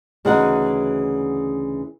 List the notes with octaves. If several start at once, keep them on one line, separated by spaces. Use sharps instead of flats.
D2 C#3 E3 D#4 F#4 F#5